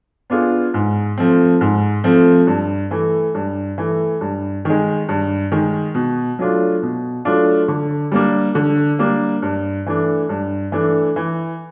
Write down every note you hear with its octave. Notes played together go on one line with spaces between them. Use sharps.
B3 D4 F4 G#4
G#2
F3 A3 C4
G#2
F3 A3 C4
G2
E3 A3
G2
E3 A3
G2
D#3 G#3
G2
D#3 G#3
B2
F#3 A3 D4 F4
B2
F#3 A3 D4 F4
D3
G3 A#3 D4
D3
G3 A#3 D4
G2
E3 A3 D4
G2
E3 A3 D4
E3